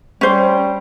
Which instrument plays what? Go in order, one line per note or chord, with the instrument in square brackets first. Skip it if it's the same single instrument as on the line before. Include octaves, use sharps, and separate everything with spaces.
[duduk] G3 [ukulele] C#4 C5